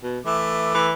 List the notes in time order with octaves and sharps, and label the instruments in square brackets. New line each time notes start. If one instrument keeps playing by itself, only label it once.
[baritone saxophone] B2
[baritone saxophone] E3 [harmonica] A3 D6
[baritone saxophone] E3